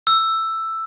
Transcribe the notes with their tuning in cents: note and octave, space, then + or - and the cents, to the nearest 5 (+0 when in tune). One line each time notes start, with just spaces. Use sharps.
E6 +5